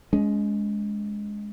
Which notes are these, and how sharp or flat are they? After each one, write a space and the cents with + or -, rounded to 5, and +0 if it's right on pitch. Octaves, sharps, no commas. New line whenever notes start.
G#3 +0 C#4 +30